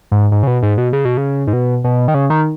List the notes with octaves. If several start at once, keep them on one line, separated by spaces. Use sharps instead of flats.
G#2
G#2
C#3
B2
G#2
B2
C#3
B2
C#3
G#2
B2
B2
D#3
C#3
D#3